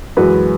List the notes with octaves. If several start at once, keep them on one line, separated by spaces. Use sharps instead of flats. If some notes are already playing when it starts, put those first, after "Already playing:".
F#2 E3 G#3 F#4 B4